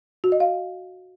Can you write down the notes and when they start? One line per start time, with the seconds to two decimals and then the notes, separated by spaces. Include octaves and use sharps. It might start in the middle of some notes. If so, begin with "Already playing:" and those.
0.24 F#4
0.32 D#5
0.40 F5